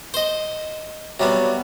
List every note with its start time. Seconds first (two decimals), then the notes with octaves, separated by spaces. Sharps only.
0.14 C5 D#5
1.20 C3 F#3 G3 B3